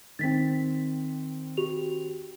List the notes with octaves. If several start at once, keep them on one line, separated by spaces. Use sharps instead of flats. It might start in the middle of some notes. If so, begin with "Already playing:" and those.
D#3 C4 A6 B6
F#4 G4 F7